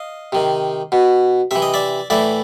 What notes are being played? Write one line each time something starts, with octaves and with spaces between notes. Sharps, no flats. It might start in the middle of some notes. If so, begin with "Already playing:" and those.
Already playing: D#5 F5
C3 D#3
B2
C3 E3 E5
D#5
D5 E5
A2 E3 D5 E5